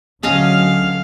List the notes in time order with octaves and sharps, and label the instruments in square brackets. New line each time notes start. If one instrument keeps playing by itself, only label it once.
[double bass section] D2 D3 F#3 [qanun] C#4 G#4 D#5 [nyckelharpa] F5